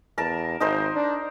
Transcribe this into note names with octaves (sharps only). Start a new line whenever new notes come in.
E2 A#4 A5
G#1 D#4 A#4 C5
D4